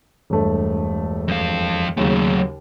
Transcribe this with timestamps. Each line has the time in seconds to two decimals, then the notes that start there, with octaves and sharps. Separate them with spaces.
0.30 E1 G2 A3
1.28 F2 F5
1.97 D#2 C#3 F#3 A3